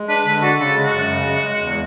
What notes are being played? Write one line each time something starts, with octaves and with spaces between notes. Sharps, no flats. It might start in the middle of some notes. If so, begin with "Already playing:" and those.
Already playing: G#3
D4 B4
D3 B4
F#4 A4
C#3 A4
G#3
F#4
F#2
C#3
G#3
G#3
E2